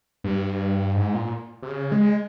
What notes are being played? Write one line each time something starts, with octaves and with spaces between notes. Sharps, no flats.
G2
G#2
A#2
C3
C#3
G#3